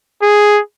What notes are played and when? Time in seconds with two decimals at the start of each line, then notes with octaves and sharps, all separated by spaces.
0.22 G#4